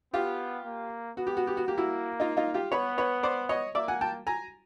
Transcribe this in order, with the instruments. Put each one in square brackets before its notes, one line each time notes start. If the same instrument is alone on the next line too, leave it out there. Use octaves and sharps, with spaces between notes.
[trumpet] B3 [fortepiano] F4 G4
[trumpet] A#3
[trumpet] B3 [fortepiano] F#4
[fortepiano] G4
F#4
G4
F#4
[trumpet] A#3 [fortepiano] G4
[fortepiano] E4 F#4
D#4 F4
D#4 F4
F4 G4
[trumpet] B3 [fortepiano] B4 C#5
[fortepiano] B4 C#5
C5 D5
C#5 D#5
[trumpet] A#3 [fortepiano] D5 E5
[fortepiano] F#5 G#5
G5 A5
G#5 A#5